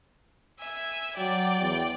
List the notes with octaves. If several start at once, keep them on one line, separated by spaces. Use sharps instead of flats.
E5 G#5
F#3 D5 G5
E2